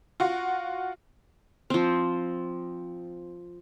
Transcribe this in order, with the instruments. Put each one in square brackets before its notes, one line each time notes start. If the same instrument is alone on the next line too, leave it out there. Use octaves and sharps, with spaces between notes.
[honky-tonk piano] F4 F#4
[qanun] F3 C4